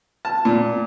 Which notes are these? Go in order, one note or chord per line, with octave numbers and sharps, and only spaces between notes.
A5
A#2